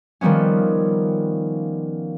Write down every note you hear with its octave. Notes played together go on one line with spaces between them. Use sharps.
D#3 F3 G3 B3 C#4